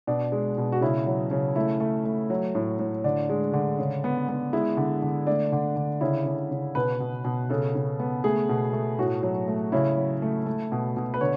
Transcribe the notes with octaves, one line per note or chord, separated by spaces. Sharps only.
B2 D4
G#3
B2
F#4
C#3 E4
F#3
C#3
A3 E4
A3
A3
F#3
A2
A2
D3 D4
G#3
D3
C#3
B3
B3
G#3 E4
D3
D3
A3 D4
D3
D3
C#3 E4
C#3
C#3
B2 B4
B2
B2
C#3 A4
C#3
B3
A3 G#4
B2
A3
A2 F#4
F#3
A3
C#3 E4
F#3
A3
A3
B2
B2
B4
D3 C#5